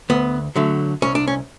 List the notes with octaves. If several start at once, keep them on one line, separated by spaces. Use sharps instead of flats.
D2 B3
D3 F#3 A3
C2 C#4
D4
C#4